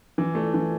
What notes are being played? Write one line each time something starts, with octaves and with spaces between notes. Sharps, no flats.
E3
A3
E3